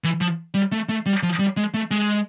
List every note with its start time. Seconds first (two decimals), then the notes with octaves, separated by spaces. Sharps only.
0.04 E3
0.21 F3
0.54 G3
0.72 A3
0.89 A3
1.06 G3
1.23 F3
1.39 G3
1.57 G#3
1.74 A3
1.91 G#3